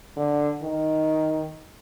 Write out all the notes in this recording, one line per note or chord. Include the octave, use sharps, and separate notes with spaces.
D3
D#3